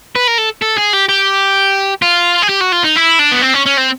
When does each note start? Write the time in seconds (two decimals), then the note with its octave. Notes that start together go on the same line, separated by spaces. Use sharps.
0.16 B4
0.28 A#4
0.38 A4
0.62 A4
0.78 G#4
0.94 G4
1.09 G4
2.02 F4
2.42 G#4
2.49 G4
2.60 F#4
2.72 F4
2.84 D#4
2.96 E4
3.19 D4
3.31 B3
3.42 C4
3.54 C#4
3.66 C#4
3.77 C4